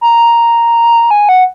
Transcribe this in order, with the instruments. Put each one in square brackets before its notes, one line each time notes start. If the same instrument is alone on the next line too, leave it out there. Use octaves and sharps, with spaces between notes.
[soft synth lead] A#5
G#5
F#5